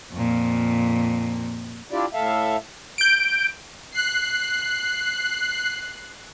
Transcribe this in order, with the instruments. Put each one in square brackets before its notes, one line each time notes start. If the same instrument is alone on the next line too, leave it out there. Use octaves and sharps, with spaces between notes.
[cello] F2 A#2
[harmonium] D4 E4 F4 G4 D5
A2 A4 E5 F5
[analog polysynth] G6 D7
[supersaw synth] F#6 C7